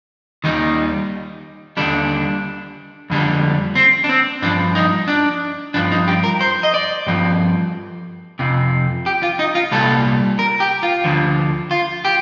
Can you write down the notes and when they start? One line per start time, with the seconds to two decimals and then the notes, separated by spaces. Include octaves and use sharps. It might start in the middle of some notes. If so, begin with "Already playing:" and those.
0.44 D#2 D#3 G3 D#4
1.77 D#2 D3 G3 D4
3.10 F2 D3 G3
3.75 C4
4.04 D4
4.09 C4
4.42 G2 F3 D4
4.75 D#4
5.08 D4
5.74 G2 F3 D4
5.92 D#4
6.08 G4
6.24 A#4
6.41 C5
6.63 D#5
6.74 D5
7.06 G2 F3
8.39 F2 C3 F3
9.06 G4
9.23 F4
9.39 D#4
9.55 F4
9.71 C2 A#2 G3 A4
10.39 A#4
10.60 G4
10.83 F4
11.04 D2 D3 F3
11.71 F4
12.05 G4